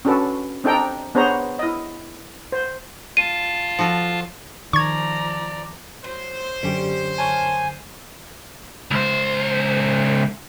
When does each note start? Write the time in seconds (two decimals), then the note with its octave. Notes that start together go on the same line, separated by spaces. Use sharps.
0.05 C#4 D4 F#4 A4 B4
0.64 C4 D4 D#4 A4 G5 A#5
1.15 B3 D4 G#4 C5 C#5 A#5
1.59 E4 D#5
2.52 C5
3.17 F4 F5 A5 D#7
3.79 F3 F#4 A4
4.73 D#3 F3 D5 A#5 C#6 G#6
6.04 F#3 C5
6.63 F#2 D3 G3 C#4 G4
7.18 D#3 C#5 G#5 A5
8.91 C#2 C5